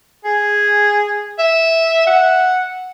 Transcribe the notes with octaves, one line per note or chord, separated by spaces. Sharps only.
G#4
E5
F#5